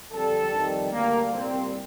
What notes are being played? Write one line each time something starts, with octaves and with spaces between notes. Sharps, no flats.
F2 D3 G3 A4
F2 D#3 G3
D2 D3 G3 A#3
C2 A#2 G3 C4